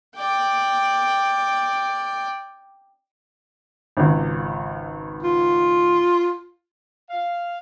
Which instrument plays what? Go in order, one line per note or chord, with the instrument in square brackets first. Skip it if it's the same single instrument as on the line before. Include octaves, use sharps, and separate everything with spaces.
[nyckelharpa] D5 G5
[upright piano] G#1 C#2
[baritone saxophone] F4
[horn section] F5